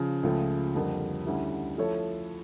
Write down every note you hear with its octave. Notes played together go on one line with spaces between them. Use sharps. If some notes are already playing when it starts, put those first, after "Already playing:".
Already playing: C#3 F3
C#2 C#3 F3 A3
F2 D3 G3 A#3
D2 D3 G3 C#4 E4
F3 A3 E4 A4 C#5